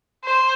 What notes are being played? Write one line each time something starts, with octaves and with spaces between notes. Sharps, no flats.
C5